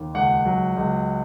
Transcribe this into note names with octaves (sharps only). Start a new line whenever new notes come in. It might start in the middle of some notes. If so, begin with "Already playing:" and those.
Already playing: D#2
C#2 F#5
F#3
C#2